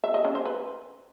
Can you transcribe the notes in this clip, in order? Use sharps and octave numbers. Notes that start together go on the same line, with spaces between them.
E5
D#5
C#4
C5
B4